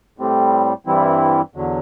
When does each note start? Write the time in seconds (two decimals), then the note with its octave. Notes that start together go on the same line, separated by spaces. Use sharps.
0.18 A2 G3 C4
0.87 G2 E3 G3 C4 E4
1.55 E2 D3 F#3